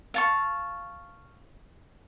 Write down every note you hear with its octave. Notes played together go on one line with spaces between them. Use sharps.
F5 A5 C#6